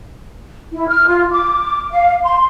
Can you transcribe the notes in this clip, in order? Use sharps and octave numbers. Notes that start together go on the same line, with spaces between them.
E4
F6
F4
D6
F5
C6